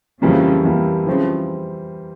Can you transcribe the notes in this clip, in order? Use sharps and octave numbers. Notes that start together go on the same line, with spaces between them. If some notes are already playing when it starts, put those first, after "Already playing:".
F2 C#3 E3 F3 G3 A#3
F2 E3 G3 A#3
C#3 E3 F3 G3 C4